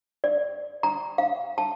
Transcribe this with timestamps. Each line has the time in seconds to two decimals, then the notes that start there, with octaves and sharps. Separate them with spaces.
0.24 D5
0.83 A#5
1.18 F5
1.58 A5